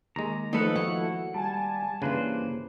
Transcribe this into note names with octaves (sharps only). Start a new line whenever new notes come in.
D#2 G#3 A#5
D#3 F3 A3 D#4 A4 B4 F#5
E4 F#4 C#5 F#5
G3 G#5 A5
G2 C#3 E3 A#3 B4 C5